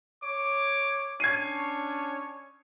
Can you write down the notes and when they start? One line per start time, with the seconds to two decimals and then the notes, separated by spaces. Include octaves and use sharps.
0.22 C#5 D6
1.20 C#4 D4 C#5 G#6 C7 D#7